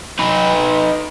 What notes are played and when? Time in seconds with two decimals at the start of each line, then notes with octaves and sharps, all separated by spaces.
0.19 D#4 B4